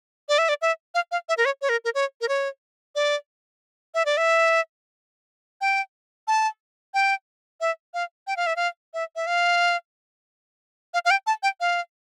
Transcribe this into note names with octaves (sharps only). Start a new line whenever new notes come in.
D5
E5
D5
E5
F5
F5
E5
A#4
C#5
C#5
A#4
A#4
C#5
A#4
C#5
D5
E5
D5
E5
G5
A5
G5
E5
F5
G5
F5
E5
F5
E5
E5
F5
F5
F5
G5
A5
G5
F5